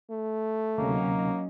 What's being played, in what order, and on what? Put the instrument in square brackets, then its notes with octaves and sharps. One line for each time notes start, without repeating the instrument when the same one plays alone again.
[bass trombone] A3
[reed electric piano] D2 C3 [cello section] F#3 C#4 D#4 [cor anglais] A#3